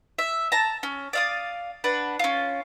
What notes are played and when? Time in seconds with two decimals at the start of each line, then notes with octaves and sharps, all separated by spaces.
0.18 E5
0.52 A5 A#5
0.83 C#4
1.13 D5 F5 D#6
1.84 D4 B4 F#5
2.19 C#4 F4